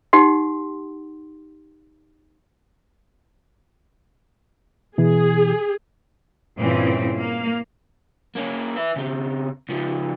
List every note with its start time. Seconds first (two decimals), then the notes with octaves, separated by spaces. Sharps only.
0.13 D#4 G4 F#5 C6
4.98 B2 E3 G#4
6.58 G2 A#2 C#3 E3 C4
7.16 A#3 F5
8.36 A#3 C#4
8.76 B4 E5
8.96 C#3 C4
9.70 C#3 F3